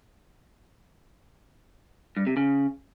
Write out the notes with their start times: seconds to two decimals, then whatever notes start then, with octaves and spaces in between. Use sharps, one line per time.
2.17 G2
2.27 C3
2.37 C#3